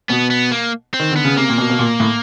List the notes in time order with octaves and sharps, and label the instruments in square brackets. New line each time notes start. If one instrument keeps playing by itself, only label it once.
[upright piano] B2 [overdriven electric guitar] B3
[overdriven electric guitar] B3
A#3
C4
[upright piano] D#3
[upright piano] D3 [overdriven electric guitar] B3
[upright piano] C#3
[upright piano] C3 [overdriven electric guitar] A#3
[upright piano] A#2
B2
B2
A#2
A2